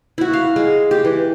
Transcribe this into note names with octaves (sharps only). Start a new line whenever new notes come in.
E4 F#4
F5
G#3
G4
E3